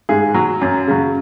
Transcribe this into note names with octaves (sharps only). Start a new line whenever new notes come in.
G#2 G#4
F#3
F#2
C#3 F#3